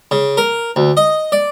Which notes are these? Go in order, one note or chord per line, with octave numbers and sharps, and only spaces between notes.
C#3
A#4
D2
D#5
D5